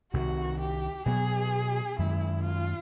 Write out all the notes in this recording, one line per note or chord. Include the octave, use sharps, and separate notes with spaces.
C2 C3 D#3 F#4
G4
B2 F#3 B3 G#4
F#2 D#3 G#3 E4
F4